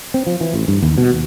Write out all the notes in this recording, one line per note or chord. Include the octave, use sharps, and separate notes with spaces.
C4
F3
E3
A1
G2
D#2
B2
D#2